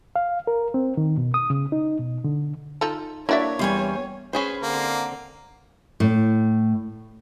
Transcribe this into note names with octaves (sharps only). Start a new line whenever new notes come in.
F5
A#4
C4
D#3
B2
D#6
C#3
D#4
B2
D3
D#4 F4 A4
A#3 D4 E4 F#4 C#5 D5 E5
E2 G3 G#5 C6
C#4 G#4 B4 C5
D3 A#3 C4
A2